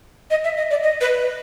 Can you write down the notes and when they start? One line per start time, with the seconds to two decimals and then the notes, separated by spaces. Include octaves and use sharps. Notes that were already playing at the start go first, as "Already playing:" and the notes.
0.31 D#5
0.44 E5
0.57 D#5
0.70 D5
0.83 D#5
1.01 B4